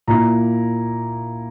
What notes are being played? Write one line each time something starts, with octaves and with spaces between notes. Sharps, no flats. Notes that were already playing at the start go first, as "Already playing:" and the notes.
A#2 A#3 E4 A#5